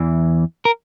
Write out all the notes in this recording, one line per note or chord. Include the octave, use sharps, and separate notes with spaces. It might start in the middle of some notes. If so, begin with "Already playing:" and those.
Already playing: E2 E3
A#4